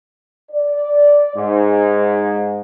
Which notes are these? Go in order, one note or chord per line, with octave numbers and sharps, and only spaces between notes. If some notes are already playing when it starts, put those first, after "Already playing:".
D5
G#2